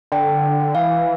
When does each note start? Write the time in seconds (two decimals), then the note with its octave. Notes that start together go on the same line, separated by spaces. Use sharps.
0.12 D3 G5
0.75 E3 F5